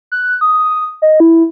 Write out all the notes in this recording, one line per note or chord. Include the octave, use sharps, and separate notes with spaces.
F#6
D#6
D#5
E4